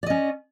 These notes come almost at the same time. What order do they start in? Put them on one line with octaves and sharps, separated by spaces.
D5 D#5 C#4